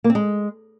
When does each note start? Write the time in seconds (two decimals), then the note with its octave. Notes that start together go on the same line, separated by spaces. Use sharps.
0.04 A#3
0.10 C4
0.15 G#3